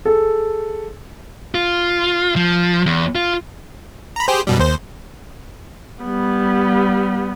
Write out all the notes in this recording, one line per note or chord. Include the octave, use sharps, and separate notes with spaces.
G#4 A4
F4
F3
E2
F4
A#5 B5
G4 G#4 C5
F#2 B2 G3
D#2 C5
G3 B3